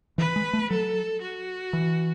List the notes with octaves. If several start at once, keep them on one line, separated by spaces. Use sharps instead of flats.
E3 B4
G#3
A3
F#3 A4
F#4
E3